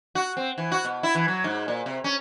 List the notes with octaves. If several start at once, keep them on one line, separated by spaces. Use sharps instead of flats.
F#4
C4
E3
F#4
B2
E4
E3
F#3
G#2
A#2
C3
C#4